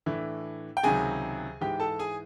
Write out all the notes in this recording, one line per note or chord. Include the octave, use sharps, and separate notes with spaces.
A2 E3 A3 D4
G5
C#2 C3 D#3 F#3 G#4 G#5
G#2 E3 G#3 G4 G5
A4 A5
G#4 G#5